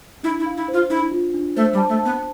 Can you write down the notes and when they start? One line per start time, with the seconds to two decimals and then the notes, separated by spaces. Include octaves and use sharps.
0.23 D4 E4
0.40 E4
0.46 F5
0.57 E4
0.68 C5
0.74 F4
0.90 D4 E4
1.11 F4
1.34 D4
1.57 A3 C5
1.73 G3
1.77 A5
1.89 A3
1.99 A5
2.05 B3